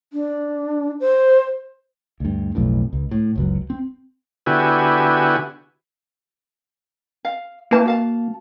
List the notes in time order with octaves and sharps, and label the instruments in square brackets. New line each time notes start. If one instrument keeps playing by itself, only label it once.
[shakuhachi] D4
C5
[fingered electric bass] D2 G2
B1 F2 A2
C#2
A2
F#1 C#2 F#3
C4
[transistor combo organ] D3 B3 E4 F#4 G4 G#5
[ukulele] F5
[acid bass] A#3 [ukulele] E4 B4 A5
[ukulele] F#4 F5 A5